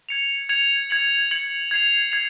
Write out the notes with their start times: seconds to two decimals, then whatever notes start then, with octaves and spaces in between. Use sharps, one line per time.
0.09 G#6 C#7 F7
0.49 G#6 C#7 F7
0.90 G#6 C#7 F#7
1.31 G#6 C#7 F#7
1.71 G#6 C7 F7
2.12 G#6 C7 F7